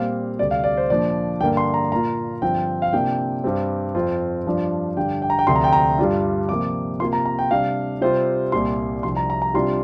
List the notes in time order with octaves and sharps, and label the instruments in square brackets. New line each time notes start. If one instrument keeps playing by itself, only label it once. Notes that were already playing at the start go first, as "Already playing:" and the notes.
Already playing: [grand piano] A#2 G3 C4 F5
D2 C3 G3 D5
F5
D5
C5
A#2 F3 D4 D5
G2 D3 A#3 D4 G5
C6
A#5
A#2 A#3 F4 A#5
G2 D3 F3 C4 F4 G5
F5
C3 A#3 D4 F4 G5
G2 G3 C4
F2 F3 C4 F4
G2 F3 D4 F4
G2 D3 G3 D4 G5
G5
A#5
G5
D2 C3 F3 D4 C6
A#5
G5
A#5
G2 G3 D4 F4
C3 F3 A#3 D6
C3 A#3 F4 C6
A#5
A#5
G5
C3 G3 D4 F5
C3 G3 C4 F4 C5
C2 A#2 G3 C6
C2 C3 F3 D4 C6
A#5
A#5
A#5
C3 G3 D4 F4 C6